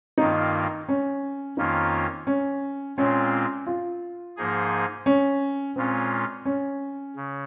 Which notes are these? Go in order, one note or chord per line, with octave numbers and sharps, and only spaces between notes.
G2 D#3 A#3 D#4 F4
C#4
F2 D#3 A#3 C#4 D#4 F4
C#4
A#2 G#3 C4 C#4 F4
F4
G#2 F3 A#3 D#4 G#4
C#4
A#2 G#3 C4 C#4 F4
C#4
C#3